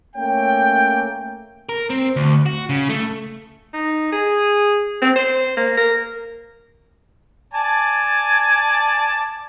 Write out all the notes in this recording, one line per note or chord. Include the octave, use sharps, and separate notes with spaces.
A3 A#3 C#4 C#5 G5
A#4
C4
D2
F#4
C#3
A3
D#4
G#4
C4
C5
A#3
A#4
D5 G#5 A5